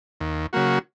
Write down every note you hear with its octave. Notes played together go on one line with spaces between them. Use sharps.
D#2
C#3 F#3 A#3 F#4